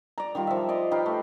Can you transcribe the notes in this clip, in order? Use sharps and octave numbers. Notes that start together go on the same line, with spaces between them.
D5 A#5
D#3 G3 F4
F3 E5
D5 D#5 C6
D#4 G4 B4 F5
A3